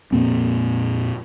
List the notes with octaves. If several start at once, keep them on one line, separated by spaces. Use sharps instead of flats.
F2 A#2 A#3 C4